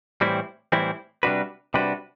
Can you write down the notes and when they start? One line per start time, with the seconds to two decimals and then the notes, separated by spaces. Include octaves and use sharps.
0.21 A2 E3 G3 C4 E4
0.72 A2 E3 G3 C4 E4
1.23 C3 G3 D4 F#4 B4
1.74 C3 G3 D4 F#4 B4